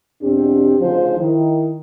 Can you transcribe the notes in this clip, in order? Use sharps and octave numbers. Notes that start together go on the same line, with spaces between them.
E2 B2 C4 D4 G4
D2 C#3 F3 D#4 C5
D#3 E4